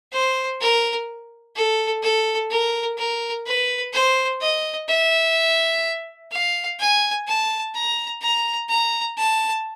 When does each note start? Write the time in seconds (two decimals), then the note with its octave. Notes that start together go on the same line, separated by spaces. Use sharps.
0.12 C5
0.61 A#4
1.56 A4
2.03 A4
2.51 A#4
2.98 A#4
3.46 B4
3.93 C5
4.41 D#5
4.89 E5
6.32 F5
6.79 G#5
7.27 A5
7.75 A#5
8.22 A#5
8.69 A#5
9.17 A5